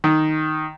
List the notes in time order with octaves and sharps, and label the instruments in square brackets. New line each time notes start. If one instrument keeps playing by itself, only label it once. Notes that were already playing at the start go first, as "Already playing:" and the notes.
[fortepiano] D#3